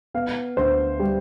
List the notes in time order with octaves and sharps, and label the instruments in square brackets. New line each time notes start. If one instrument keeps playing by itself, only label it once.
[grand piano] B3 F5
D2 C5
G3